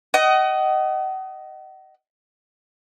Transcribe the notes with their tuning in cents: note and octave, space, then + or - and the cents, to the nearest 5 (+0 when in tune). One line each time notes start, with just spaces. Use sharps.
D#5 +0 F#5 +40